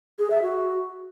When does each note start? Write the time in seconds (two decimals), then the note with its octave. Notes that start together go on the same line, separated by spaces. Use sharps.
0.19 G#4
0.31 E5
0.42 F#4